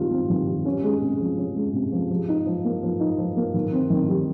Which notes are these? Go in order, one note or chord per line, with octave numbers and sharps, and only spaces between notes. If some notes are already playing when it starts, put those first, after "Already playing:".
Already playing: D#3 G3 C4 F4
C4
D#3
G3
C#4
G#3
C3
F3
C#4
G#3
C3
F3
F3
D#4
F3
A#3
F3
D#4
F3
A#3
D#3
C4
D#3
G3